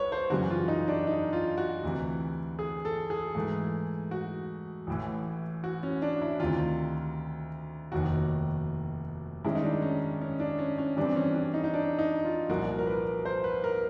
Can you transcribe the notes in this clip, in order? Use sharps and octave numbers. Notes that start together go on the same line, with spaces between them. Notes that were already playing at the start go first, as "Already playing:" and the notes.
Already playing: C2 B4 C#5
C5
F#2 C#3 E3 G3 F#4
F4
D#4
D4
D#4
F4
F#4
D2 C3 E3
G#4
A4
G#4
G#2 E3 A3
F#4
A1 A2 E3
F#4
C#4
D4
E4
D2 C3 D#3 F4
F1 D#2 D#3 F#4
G2 D#3 G#3 C#4 E4
D#4
D4
C#4
C#4
D4
C#4
C#4
G2 E3 G3 C4 D4
C#4
D4
D#4
D#4
D4
D#4
F4
C2 A#2 F3 A#3 F#4
A#4
B4
C5
B4
A#4